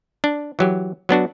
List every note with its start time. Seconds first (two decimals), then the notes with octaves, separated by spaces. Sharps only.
0.24 D4
0.59 E3 F#3 G4
1.09 F#3 B3 D4 F#4